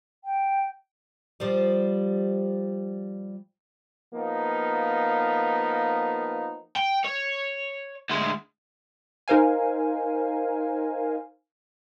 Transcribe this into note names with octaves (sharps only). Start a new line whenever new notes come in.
G5
F3 G3
F3 A#3 B3 D#4
G5
C#5
D2 G#3
D#4 A#4 C5 F5 G#5